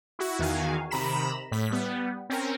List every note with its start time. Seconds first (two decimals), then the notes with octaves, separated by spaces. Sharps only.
0.19 E4 F#4
0.39 E2 D#3 F#4 F5 G#5
0.91 C3 D#3 A#5 B5 E7
1.52 A2 B6
1.71 G3 B3
2.30 C4 C#4 A#4